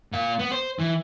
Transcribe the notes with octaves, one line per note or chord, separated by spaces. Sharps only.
A#2 F5
B3
C5
E3